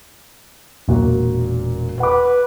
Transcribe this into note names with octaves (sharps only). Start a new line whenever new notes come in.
E1 A#2 F#4
B4 F#5 D6